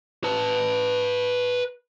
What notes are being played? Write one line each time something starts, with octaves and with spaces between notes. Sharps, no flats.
B4 A5